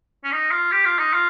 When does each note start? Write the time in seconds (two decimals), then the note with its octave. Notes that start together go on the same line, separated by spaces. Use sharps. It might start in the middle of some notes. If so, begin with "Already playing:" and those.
0.24 C#4
0.32 D#4
0.52 F4
0.71 G4
0.85 F4
0.99 D#4
1.13 F4